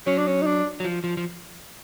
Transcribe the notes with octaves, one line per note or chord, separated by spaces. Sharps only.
F#3 C#4
D4
C#4
D#4
D4
F#3
F3
F3
F3